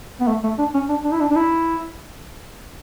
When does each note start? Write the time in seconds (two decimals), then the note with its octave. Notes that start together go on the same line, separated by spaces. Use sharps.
0.21 B3
0.28 A3
0.44 A3
0.59 D4
0.74 C#4
0.89 D4
1.04 D4
1.13 E4
1.20 D4
1.31 D4
1.36 E4